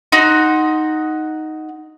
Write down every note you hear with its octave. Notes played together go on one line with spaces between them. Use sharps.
D#4 F#4 C6